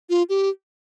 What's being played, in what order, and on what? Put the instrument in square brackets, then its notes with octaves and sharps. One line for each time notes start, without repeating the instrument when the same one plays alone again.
[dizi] F4
G4